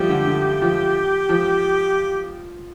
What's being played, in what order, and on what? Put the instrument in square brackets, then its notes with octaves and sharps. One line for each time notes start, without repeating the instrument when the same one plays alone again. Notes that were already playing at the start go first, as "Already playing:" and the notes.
Already playing: [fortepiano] F3 G3 A3 [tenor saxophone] G4
[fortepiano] D3
D3
F3
F3